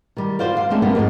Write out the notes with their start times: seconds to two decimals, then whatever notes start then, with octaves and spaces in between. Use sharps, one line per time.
0.17 D#3 G3
0.39 F4 F#4 A#4 C5 D5 F5
0.57 F5
0.70 G#3 A3 C4 D4 D#4
0.82 G3 A#3 B3 D4
0.95 F2 G#2 F3 G#3